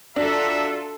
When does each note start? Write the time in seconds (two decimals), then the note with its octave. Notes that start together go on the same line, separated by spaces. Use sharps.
0.16 D4 F4 F#4 A4 E5 A#5 E6